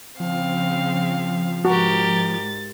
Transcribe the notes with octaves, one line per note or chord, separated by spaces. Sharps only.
C#3 F3 C4 F5
G#2 F#4 G4 A#4 A6